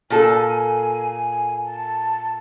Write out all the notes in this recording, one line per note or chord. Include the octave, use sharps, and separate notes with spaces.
A#2 A4 G#5
A5